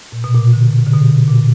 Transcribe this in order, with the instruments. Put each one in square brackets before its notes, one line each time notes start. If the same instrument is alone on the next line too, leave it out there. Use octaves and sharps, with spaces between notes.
[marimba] A#2
B2
A#2
A#2 D3
D3
B2
A#2